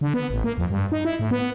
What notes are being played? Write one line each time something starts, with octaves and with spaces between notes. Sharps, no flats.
D3
B3
A1
A#3
F2
G2
D#4
E4
A2
B3